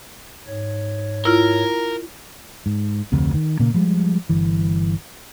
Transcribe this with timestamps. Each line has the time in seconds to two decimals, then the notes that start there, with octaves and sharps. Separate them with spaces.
0.47 G#2 C#5
1.25 E4 F4 A#4
2.66 G#2
3.12 F1 D2 C3
3.34 D#3
3.59 A#2 C#3 A#3
3.74 F3 G3 G#3
4.29 G1 E3